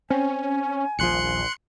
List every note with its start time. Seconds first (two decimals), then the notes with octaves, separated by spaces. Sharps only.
0.10 C4 C#4 G#5
0.99 D#1 A#1 F3 C6 F#6 C#7